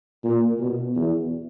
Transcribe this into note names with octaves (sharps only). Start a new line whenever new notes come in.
A#2
B2
E2